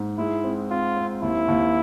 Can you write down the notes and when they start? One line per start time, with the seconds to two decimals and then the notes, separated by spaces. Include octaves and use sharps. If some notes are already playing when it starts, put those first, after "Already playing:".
Already playing: G#2
0.18 G#3 E4
0.44 C4
0.70 C4 F4
0.96 C4
1.22 D#2 E4
1.48 D#2